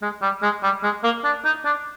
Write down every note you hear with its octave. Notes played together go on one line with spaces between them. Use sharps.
G#3
G3
G#3
G3
G#3
A#3
D4
D#4
D4